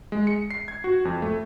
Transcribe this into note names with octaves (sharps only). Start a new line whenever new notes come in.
G#3
C#7
C7
G#6
F#4
F2
A3